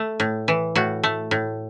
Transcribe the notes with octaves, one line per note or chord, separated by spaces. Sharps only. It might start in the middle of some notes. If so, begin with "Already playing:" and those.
Already playing: A3
A2
E3
A2 F#4
A3
A2